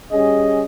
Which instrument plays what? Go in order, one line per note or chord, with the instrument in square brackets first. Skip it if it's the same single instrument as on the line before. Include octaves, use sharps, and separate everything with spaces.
[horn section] G3 C#4 G#4 D#5